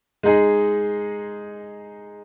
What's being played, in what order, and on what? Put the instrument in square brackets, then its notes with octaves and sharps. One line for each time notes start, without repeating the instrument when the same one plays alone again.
[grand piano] G#3 D#4 G#4